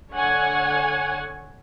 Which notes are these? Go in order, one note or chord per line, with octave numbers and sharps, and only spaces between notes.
D3 C#5 F#5 G#5